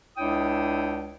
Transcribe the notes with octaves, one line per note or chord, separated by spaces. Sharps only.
C#2 D4 E4 C#5 G5 D#6